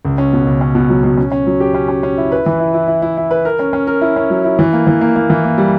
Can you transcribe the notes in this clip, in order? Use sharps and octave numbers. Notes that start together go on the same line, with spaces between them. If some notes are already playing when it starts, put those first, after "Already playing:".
C#2
C#4
B2
C#2
C#4
B2
F#3
B2
C#4
C#4
F#3
G4
C#4
C#4
C#4
E4
B4
E3
E4
E4
E4
E4
E4
B4
A#4
C#4
C#4
A#4
E4
C#4
F#3
E4
E3
A#3
E3
A#3
A#3
E3
A#3
G3